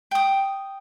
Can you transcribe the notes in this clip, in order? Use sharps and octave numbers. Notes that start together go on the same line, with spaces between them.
G5 D#6